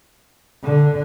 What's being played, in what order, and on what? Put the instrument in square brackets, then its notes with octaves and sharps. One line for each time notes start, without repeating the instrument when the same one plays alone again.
[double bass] D3